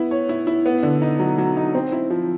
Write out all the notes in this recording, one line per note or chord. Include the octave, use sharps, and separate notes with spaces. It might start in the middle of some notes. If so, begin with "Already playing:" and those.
Already playing: B3 E4
C#5
E4
E4
B3
D3
D#4
F#3
F#3
D#4
C4
E4
F3